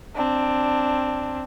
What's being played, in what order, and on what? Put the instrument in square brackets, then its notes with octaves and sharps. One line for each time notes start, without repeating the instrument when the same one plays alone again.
[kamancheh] C4 D4